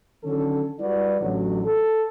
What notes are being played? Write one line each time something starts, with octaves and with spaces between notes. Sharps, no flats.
D3 D#3 F#3 C#4 A4
G3 E4 F#4 B4 D5
A1 D3 F#3
A4